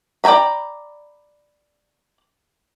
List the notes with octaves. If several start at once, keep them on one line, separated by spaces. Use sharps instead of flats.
D5 G5 G#5 A#5 B5